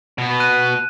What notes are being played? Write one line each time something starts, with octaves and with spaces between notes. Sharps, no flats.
B2 B3
F#6 D#7